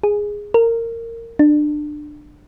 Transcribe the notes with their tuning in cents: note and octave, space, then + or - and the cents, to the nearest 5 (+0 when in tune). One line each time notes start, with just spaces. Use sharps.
G#4 -5
A#4 -20
D4 +25